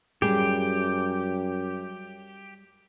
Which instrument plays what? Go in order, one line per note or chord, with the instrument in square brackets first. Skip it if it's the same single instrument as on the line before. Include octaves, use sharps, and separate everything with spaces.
[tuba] F#2 [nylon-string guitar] G3 G#4 [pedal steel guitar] G4